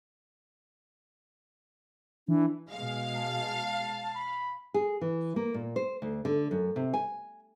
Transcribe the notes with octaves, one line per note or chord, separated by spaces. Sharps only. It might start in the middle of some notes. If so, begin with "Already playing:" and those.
E3 D4
B2 G#3 F5
A5
B5
G#4
E3
A#3
A#2
C5
D2
D3
F#2
C3
G#5